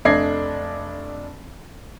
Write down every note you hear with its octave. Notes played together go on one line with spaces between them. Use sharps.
F1 A3 D4 D#5 G#6 C7